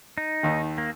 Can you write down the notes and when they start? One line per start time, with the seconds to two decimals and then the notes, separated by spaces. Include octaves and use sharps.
0.18 D#4
0.43 D#2 D#3
0.78 A#3